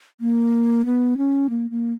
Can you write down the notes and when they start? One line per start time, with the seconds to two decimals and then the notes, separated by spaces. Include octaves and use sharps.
0.21 A#3
0.85 B3
1.17 C#4
1.50 A#3
1.70 A#3